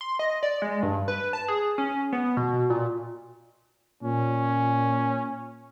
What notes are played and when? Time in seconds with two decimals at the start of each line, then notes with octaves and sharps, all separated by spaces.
0.01 C6
0.19 D#5
0.43 D5
0.62 G#3
0.83 G2
1.08 B4
1.33 A5
1.48 G#4
1.78 C#4
2.13 B3
2.37 B2
2.70 A#2
4.03 A#2 C#4